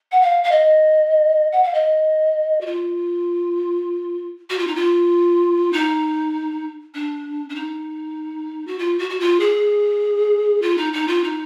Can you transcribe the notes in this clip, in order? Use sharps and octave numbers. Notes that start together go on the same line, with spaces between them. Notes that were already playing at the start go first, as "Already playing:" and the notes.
F#5
F5
F5
D#5
F#5
F5
D#5
F#4
F4
F#4
F4
D#4
F4
D#4
D4
D4
D#4
F#4
F4
F#4
F#4
F4
G#4
F4
D#4
D#4
F4
D#4